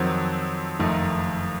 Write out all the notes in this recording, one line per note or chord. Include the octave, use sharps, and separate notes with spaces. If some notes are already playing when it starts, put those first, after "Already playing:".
Already playing: F2 D#3 F#3 C4
F#1 F2 D#3 A3 D#4